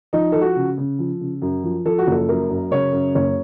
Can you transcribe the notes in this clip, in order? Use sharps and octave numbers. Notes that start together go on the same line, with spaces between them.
F3 D#4
F3 A4
F#4
C#3
C#3
F3
C#3
F#2
F3
F3 A4
F#4
F#1 A4
F#2 A#4
F#2
C#3 C#5
F#2
F#1 C#5